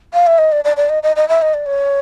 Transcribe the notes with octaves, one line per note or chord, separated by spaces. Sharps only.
F5
E5
D#5
D5
D5
D5
D#5
D#5
D#5
E5
D#5
D5
C#5